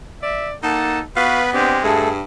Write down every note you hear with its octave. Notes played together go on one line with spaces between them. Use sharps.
D5 E5
A#3 D#4 A4 F#5 A5
B3 F#4 B4 F5
G#3 C4 D4 G4
G2 A3 G#4 A4